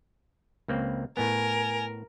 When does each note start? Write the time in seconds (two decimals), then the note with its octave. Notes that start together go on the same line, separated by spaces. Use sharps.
0.68 C#2 A#3 C4
1.17 A2 B3 A#4 G#5